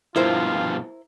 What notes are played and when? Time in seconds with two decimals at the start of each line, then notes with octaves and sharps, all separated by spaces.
0.16 G2 B2 F3 E4 F4 A#4 C5